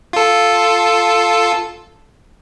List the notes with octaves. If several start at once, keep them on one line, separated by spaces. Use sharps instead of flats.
F4 A4